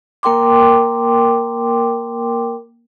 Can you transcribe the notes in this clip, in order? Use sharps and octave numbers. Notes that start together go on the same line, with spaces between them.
A#3 A#4 G5 C6 D6